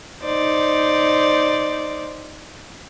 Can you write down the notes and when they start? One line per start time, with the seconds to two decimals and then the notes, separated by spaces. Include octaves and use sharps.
0.24 D#4 C5 D5